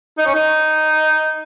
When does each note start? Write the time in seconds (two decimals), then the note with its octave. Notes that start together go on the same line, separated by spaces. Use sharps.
0.18 D#4
0.27 C#4
0.34 D#4